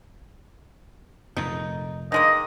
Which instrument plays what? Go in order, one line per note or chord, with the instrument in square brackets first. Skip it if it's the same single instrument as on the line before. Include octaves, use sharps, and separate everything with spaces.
[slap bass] F1 F2 A#2 [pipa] D#4
[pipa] D#3 G#3 A#3 [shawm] D#5